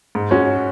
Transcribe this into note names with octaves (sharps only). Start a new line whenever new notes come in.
G#2
G#3 C#4 F#4